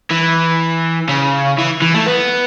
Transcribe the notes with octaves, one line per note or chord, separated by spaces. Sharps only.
E3
C#3
E3
E3
A3
B3